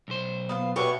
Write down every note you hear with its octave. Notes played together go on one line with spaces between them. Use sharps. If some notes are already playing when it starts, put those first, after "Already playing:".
B1 C5
B3 F4 F5
B2 B3 D4 G4 C#5 E5 C#6